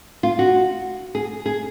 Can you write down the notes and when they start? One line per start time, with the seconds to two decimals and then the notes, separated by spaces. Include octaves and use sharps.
0.23 F4
0.39 F#4
1.15 G#4
1.46 G#4